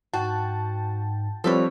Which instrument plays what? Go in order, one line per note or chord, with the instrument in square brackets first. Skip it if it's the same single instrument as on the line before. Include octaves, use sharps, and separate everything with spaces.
[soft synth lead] G#2 [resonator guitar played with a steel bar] F#4 [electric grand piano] G5 A5
[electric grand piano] F3 G3 C4 [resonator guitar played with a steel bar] A4 B4 C#5